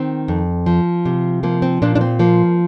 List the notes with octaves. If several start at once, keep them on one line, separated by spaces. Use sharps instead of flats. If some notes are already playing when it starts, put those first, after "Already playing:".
Already playing: D#3 C4
F2
F3
C3
F3 A#3
C4
A#2 A#3 D4
D4
C4
F3 A#3